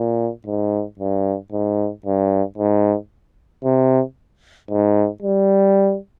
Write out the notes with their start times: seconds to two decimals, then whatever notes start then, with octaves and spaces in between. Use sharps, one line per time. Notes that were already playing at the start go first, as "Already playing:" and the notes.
Already playing: A#2
0.46 G#2
0.99 G2
1.52 G#2
2.06 G2
2.58 G#2
3.64 C3
4.71 G#2
5.23 G3